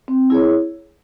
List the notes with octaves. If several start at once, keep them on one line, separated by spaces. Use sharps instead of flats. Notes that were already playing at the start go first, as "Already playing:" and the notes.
C4
E4 G#4 C#5